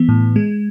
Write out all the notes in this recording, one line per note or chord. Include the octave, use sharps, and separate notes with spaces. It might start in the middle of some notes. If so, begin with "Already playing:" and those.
Already playing: E3 B3
A2
G#3